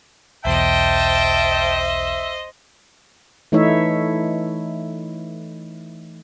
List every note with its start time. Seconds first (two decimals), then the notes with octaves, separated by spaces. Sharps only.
0.45 B1 E2 B2 C5 D#5 E5 G5 A5
3.52 E3 A3 D#4 E4 C#5 E5